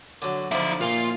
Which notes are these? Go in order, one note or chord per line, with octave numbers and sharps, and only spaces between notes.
D3 F#3
D3 F3 D#4 E5
A#2 F4